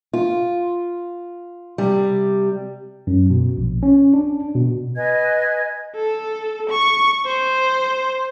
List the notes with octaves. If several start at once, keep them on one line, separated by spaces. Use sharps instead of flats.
F4
C3 G3
F#2
B2
A#1
C#4
D4
B2
B4 D#5 G#5 G#6
A4
C#6
C5